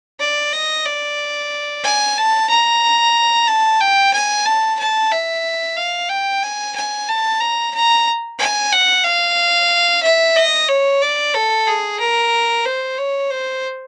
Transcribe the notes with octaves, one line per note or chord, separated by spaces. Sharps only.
D5
D#5
D5
G#5
A5
A#5
A5
G5
G#5
A5
A5
E5
F5
G5
G#5
G#5
A5
A#5
A#5
G#5
F#5
F5
E5
D#5
C#5
D5
A4
G#4
A#4
C5
C#5
C5